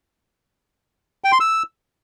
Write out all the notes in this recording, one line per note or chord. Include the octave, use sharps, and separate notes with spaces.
G5
C6
E6